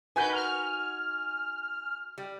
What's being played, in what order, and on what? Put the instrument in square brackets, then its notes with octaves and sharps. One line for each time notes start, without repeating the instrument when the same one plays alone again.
[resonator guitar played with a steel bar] D#4 F#4 A#4 [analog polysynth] B4 G6 [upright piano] G#5
[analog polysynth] F6
[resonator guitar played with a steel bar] G3